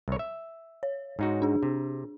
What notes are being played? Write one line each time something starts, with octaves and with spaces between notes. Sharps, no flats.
C2 C#5
E5
C#5
G#2 D#4 F#4
D4 G#4
C3